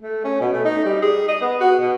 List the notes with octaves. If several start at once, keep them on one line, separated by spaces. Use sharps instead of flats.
A3
C#4
B2
A3
D#4
G3
G#4
D#5
B3
F#4
B2